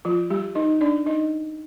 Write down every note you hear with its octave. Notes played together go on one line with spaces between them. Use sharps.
F3 F4
G3 G4
D#4 D#5
D4 D5
D#4 D#5